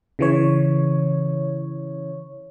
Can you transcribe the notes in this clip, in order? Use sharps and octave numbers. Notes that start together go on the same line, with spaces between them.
C#3 E3 C#5